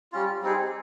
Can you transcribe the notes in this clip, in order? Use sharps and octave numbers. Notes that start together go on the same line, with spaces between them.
G3 C#4 F4
G3 C4 D#4 G#4